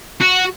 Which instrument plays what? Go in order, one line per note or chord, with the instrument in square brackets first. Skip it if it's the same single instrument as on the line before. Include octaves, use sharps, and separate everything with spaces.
[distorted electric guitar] F#4